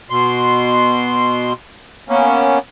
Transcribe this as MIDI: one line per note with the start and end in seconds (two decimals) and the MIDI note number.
0.10 1.53 47
0.10 1.53 84
2.09 2.59 58
2.09 2.59 59
2.09 2.59 61